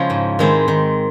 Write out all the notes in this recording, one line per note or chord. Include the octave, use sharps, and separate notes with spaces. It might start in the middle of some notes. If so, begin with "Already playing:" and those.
Already playing: C#3 F3 G#3 C#4 E4
G#2
D#3 G#3 C4 E4
D#3